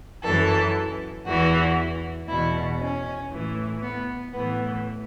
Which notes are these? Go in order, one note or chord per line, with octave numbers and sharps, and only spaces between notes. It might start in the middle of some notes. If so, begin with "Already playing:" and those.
F#2 E3 A4
E2 E3 F#4
E2 B2 E4
C#4
A2 E3
B3
A2 E3 B3